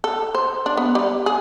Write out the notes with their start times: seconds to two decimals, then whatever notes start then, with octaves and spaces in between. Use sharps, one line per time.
0.04 A4
0.34 C5
0.66 D4
0.77 B3
0.95 G3
1.26 G#4